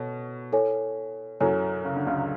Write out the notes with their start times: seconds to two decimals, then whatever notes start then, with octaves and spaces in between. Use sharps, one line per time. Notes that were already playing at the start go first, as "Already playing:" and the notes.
Already playing: B2 A4 C#5
0.52 E4 A4 C#5 G#5
1.40 F#2 F#3 E4 A4 C#5 G#5
1.85 C#3
1.96 D3
2.07 C#2 C#3